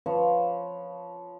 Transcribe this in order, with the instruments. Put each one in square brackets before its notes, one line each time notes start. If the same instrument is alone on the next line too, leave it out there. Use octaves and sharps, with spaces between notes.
[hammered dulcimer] F3 B4 C#5